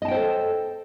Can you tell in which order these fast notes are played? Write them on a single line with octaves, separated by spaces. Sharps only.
D#5 A5 G5 C5 A4